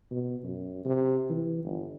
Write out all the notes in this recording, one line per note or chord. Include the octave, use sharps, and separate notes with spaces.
B2
F#2
C3
E3
G1